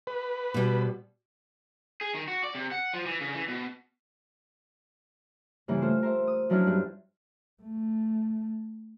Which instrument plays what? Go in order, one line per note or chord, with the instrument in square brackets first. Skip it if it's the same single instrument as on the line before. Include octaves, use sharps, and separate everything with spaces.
[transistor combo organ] B4
[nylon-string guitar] B2 G3
[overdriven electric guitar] G#4
D#3
F#4
D5
C3
F#5
F3
E3
C#3
E3
B2
[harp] G2 C#3 E3 A#3 E4
A3 F4 C5
A#4 C5 E5
D#6
F3 F#3 C#4 D4 E4 F4
G2
[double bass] A3